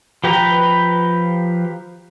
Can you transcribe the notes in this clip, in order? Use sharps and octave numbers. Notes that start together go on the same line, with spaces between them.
F3 G4 B4 G5 A#5